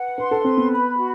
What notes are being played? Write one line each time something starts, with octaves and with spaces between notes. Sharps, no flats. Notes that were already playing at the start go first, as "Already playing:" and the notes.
Already playing: B4 F#5
B4 C6
A4
C4 B4
B3
B5
F#4